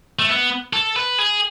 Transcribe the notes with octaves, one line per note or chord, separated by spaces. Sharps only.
A3
B3
A4
B4
G#4